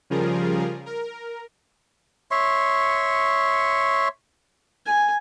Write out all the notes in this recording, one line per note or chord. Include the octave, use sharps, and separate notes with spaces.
C#3 F3 G3 F4 G#4 A#4
A#4
C#5 E5 C6 C#6
G#5